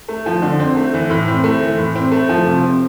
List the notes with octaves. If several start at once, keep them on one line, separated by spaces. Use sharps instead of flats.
A3
F3
D3
C4
A3
E3
A2
C4
A3
E3
A2
C4
A3
F3
C3
C4